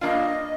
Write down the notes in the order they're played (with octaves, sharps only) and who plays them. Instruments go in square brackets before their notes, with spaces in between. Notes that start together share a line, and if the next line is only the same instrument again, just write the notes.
[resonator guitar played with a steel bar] G2 D#3 A#3 D4 F4 [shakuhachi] D#5